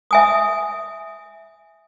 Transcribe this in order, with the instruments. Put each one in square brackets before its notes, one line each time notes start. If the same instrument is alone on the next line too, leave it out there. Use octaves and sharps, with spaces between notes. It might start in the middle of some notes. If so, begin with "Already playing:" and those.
[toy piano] E5 G#5 D#6